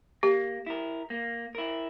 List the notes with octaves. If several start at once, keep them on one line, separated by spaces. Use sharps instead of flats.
A#3 G4
E4 A#4
A#3
E4 A#4